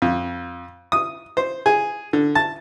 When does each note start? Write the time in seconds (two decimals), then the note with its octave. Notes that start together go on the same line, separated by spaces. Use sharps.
0.02 F2
0.92 D#6
1.37 C5
1.66 G#4
2.13 D3
2.35 A5